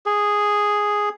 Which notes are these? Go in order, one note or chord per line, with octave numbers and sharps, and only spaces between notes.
G#4